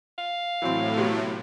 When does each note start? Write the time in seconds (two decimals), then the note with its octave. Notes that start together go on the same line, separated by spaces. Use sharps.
0.18 F5
0.62 A2 E3 F#3 C4
0.97 C3 F#3 B3